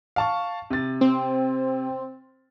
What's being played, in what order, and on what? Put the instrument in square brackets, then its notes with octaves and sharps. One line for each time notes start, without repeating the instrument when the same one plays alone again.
[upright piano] F5 A5 C#6
C3 A6
[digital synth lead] C4